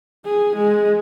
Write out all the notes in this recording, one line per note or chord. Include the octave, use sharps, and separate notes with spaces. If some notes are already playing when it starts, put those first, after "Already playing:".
G#4
G#3